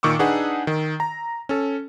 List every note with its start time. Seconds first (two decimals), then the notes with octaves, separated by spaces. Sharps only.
0.03 A#2 D#3 C#6 D6 E6
0.19 D4 D#4 G#4 B4 F#5
0.67 D#3
1.00 A#5
1.49 C#4 A4